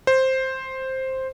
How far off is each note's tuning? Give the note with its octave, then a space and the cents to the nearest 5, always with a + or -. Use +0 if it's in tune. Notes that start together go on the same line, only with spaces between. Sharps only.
C5 +5